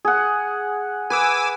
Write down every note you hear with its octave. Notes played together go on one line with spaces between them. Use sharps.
G#4 F#5
B4 G#5 D6 E6